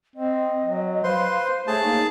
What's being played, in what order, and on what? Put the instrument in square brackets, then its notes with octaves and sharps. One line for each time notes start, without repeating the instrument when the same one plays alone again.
[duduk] C4 [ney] D#5
[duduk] F#3
[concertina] B4 C6 [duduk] C5 [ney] F5
[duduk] A3 [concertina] G#4 A5 [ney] C#5
[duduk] A#3 [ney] D#4